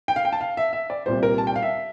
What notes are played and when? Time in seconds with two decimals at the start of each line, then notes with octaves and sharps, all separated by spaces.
0.08 G5
0.16 F5
0.25 G5
0.33 A5
0.41 F5
0.57 E5
0.73 E5
0.90 D5
1.06 C2 A#2 G3 C5
1.23 A#4
1.38 A5
1.47 G5
1.56 F5
1.63 E5